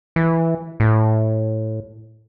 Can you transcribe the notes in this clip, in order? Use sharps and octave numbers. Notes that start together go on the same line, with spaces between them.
E3
A2